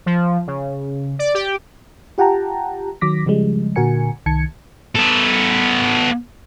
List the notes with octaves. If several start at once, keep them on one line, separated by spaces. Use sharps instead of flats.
F3
C#3
D5
G4
F4 G4 F#5 G5 A5 A#5
D#3 F#3 D6 A#6 B6
C#3 F3 G3 G#3
A#2 D3 F#4 A#4 G#5 C#7
C2 D#3 A5 G#6 C#7
B3 A4